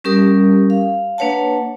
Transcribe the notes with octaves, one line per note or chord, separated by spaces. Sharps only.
G3 C#4 G4 A#4 D#6
F5
A#3 D4 B4 C#5 F#5 A5